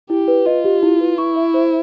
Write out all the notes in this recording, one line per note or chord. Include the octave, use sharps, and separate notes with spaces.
E4 G4
B4
F4 D#5
G4
E4
B4
E4 C#6
E5
C5